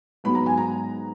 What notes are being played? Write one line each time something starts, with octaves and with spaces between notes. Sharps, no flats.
G#2 F#3 B3 B5
A#5
G#5
A#5